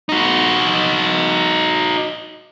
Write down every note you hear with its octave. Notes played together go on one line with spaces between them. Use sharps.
D#4 F#4